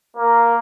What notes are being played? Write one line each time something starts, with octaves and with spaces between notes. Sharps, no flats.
A#3